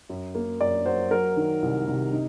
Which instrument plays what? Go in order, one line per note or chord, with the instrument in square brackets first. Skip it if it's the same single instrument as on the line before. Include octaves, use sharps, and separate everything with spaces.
[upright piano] F#2
A#3
F#2 D5
F#3 C5
F#3 A#4
D#3
C2
C3
D#4